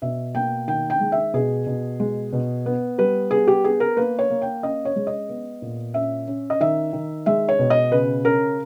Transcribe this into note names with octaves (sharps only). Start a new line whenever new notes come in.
B2 E5
A#3 G5
D#3 G5
G5
G#3
E5
B2 G#4
B2
G#3
B2
B3
G3 B4
B3 G#4
G4
B3 G#4
A#4
A#3 B4
C#5
A#3
G5
C#4 D#5
C#5
G#3
D#5
B3
A#2
C#4 E5
C#4
D#5
D#3 E5
D#3
G#3 E5
C#5
B2
D#5
C#3 B4
C#4 A#4